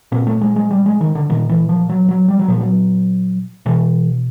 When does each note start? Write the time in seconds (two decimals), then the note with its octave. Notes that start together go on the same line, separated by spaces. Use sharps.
0.12 A#2 C4
0.27 A3
0.41 G#3
0.56 G#3
0.71 G3
0.86 G#3
1.01 D#3
1.15 D3
1.30 A#2 D#3
1.49 E3
1.69 F3
1.89 F#3
2.09 F#3
2.28 G3
2.39 F#3
2.48 A#2 F3
2.61 F#3
3.66 B2 E3